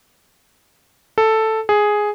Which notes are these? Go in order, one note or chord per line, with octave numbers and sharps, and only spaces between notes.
A4
G#4